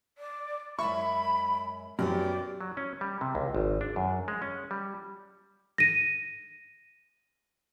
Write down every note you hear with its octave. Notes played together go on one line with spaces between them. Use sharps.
D5
F#2 G#3 E5 B5 C#6
F#2 B3 D#4 G4 D5
F#3
C#4
G3
C3
C#2
G#1
D4
F#2
G#3
C#4
G3
A#6 D#7